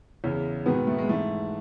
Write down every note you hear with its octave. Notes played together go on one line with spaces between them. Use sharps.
E2 C#3 E3
G#2 B2 D#3 B3
A3
G#3
G#2 E3 A3